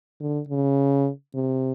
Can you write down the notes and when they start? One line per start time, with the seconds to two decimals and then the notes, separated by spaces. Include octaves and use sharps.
0.21 D3
0.49 C#3
1.35 C3